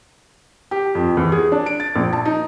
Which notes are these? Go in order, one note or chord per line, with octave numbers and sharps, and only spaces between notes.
G4
F2
E2
G#4
D4
D7
A6
A#1
A5
D#4